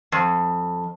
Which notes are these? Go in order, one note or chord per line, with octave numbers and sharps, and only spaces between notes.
F2